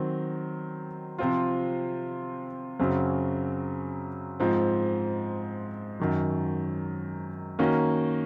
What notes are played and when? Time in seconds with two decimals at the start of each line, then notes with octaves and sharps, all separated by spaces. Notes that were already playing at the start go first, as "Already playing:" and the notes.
Already playing: D#3 F#3 C4
1.18 C3 F3 C4 F4
2.79 F#2 C#3 F#3 C4
4.40 G#2 F3 C4
6.00 F#2 D#3 F#3
7.59 D#3 A#3 C#4 F#4